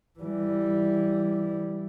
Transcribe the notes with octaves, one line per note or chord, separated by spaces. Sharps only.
E3 G3